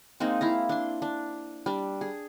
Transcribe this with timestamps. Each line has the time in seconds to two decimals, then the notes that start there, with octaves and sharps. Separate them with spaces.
0.20 G#3 A#3 C4 D#4
0.41 E4 F5 A#5
0.69 D4 C6
1.02 D4
1.66 G3 D4
2.01 G#4